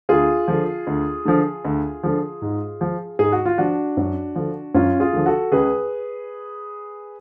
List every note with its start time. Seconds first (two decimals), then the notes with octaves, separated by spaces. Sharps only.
0.09 D2 F4 G#4
0.48 D3 F3
0.87 D2
1.25 D3 F3
1.65 D2
2.03 D3 F3
2.42 G#2
2.81 F3
3.19 G#2 G#4
3.32 F#4
3.45 F4
3.58 F3 D4 F#4
3.97 F#2
4.36 D3 F3
4.75 F#2 C#4 F4
5.00 F4 G#4
5.13 D3 F3
5.26 F#4 A4
5.52 C#2 G#4 B4